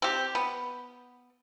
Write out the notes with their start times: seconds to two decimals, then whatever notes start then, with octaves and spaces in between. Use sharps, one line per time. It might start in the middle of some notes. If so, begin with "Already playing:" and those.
0.02 C4 G4
0.35 B3